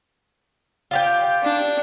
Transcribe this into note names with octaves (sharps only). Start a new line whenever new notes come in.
F4 G4 G5
D4